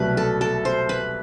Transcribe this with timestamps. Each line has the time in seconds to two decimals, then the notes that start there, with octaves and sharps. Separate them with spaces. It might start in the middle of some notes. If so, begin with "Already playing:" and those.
Already playing: C2 B2 F#3 A3 B4
0.17 A4
0.41 A4
0.65 C5
0.89 B4